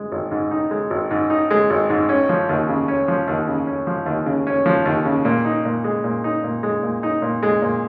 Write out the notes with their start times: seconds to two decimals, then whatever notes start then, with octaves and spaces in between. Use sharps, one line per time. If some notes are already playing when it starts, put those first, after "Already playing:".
Already playing: G#3
0.12 G#1
0.31 G#2
0.51 D#4
0.71 G#3
0.90 G#1
1.11 G#2
1.30 D#4
1.51 G#3
1.70 G#1
1.90 G#2
2.09 C#4
2.29 F3
2.49 D#2
2.69 C#3
2.88 C#4
3.08 F3
3.28 D#2
3.47 C#3
3.67 C#4
3.87 F3
4.06 D#2
4.26 C#3
4.47 C#4
4.66 F3
4.85 D#2
5.05 C#3
5.25 A#2
5.45 D#4
5.65 A#2
5.84 G#3
6.04 A#2
6.24 D#4
6.44 A#2
6.63 G#3
6.83 A#2
7.03 D#4
7.22 A#2
7.43 G#3
7.62 A#2